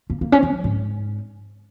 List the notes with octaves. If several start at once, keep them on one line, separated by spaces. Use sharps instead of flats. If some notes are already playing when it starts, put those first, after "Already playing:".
A#3
A#3
C#4
C4
F3
G#2